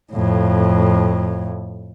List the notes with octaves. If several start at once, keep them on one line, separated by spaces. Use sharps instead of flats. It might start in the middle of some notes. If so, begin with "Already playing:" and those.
F2 A2